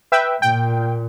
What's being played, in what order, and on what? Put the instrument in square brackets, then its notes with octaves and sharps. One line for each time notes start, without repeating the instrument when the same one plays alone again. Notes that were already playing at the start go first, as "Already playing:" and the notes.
[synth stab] B4 E5 G5
[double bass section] A#2 [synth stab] G5